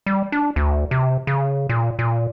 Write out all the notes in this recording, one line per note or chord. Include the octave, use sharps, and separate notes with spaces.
G3
D4
D2
C3
C#3
A#2
A#2